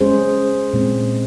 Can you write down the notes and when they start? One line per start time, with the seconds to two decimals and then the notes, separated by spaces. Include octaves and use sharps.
0.01 G#3 C#4 G#4 C5
0.73 A#2 G#3 C4